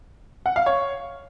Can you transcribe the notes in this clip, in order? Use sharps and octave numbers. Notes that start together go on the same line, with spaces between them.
F#5
F5
C#5